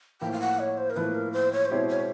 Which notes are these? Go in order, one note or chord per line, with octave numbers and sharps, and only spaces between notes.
A2 F3 A#3 G5
F5
F#5
C#5
C5
A#4
A2 F3 A#3 B4
A#4
C5
C#5
C5
B2 G#3 C4 E4 G4 C#5
C#5